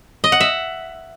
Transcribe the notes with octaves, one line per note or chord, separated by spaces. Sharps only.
D#5
F#5
E5